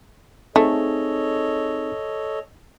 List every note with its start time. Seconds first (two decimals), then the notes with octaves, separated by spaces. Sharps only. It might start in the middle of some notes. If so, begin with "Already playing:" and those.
0.56 A3 C4 D#4 G#4 A4 C#5 D#5